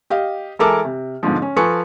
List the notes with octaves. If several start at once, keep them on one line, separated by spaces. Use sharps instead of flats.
G4 D#5 F5
E3 G#3 A4 A#4 A5 D6
C3
G#2 B2 D3 F3
C#4
F3 A4 B4 G#5 C#6 C#7